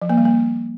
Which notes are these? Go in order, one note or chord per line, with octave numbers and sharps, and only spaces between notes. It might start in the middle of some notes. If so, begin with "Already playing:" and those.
F3
A#3
G3
A#3